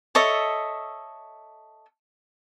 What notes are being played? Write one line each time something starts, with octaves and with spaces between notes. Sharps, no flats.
A4 C#5 D#5 E5